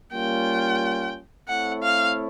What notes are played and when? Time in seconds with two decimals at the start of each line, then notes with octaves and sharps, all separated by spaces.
0.13 G3 A#3 C#4 F4 G5
1.48 A3 C4 E4 A4 C#5 F#5
1.83 F5